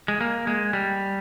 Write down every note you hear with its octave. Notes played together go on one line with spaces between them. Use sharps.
G#3
A#3
G#3
G3